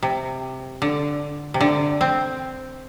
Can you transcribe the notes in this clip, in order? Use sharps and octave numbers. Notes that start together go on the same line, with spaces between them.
C3
D3
C3
D3
C4